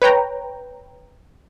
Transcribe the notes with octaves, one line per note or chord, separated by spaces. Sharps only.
B4 C#5 G5 A#5